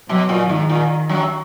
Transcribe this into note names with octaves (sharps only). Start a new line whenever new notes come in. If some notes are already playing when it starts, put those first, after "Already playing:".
B2 F#3
A#2
G#2 D#3
A#2
F#2 F#3